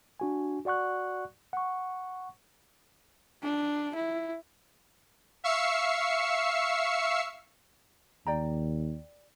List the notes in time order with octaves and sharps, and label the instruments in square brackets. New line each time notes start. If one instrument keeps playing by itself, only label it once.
[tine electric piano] D4 F#4 G#5
F#4 D5 F#5 C#6 F#6
F#5 C#6
[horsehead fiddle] D4
E4
[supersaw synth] E5 F5 C#6 E6 C7 C#7
[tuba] D#2 [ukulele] D5 G5 A#5